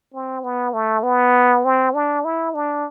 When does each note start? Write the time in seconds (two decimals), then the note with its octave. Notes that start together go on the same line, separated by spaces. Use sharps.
0.14 C4
0.43 B3
0.74 A3
1.03 B3
1.65 C4
1.94 D4
2.25 E4
2.54 D4